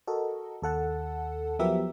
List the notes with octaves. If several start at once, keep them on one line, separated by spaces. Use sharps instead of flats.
F#4 A4 A#4 D#5
D#2 A4 F#5 A5
F3 F#3 B3 G4 A#4 E5